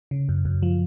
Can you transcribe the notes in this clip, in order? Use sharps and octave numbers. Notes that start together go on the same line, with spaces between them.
C#3
F#2
F#2
F3